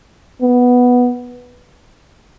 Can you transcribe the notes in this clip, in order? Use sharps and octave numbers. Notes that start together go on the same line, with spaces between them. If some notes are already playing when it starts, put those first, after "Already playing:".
B3